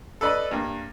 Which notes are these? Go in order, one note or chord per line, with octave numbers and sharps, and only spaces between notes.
A4 B4 D5 D#5 B5
G2 A#3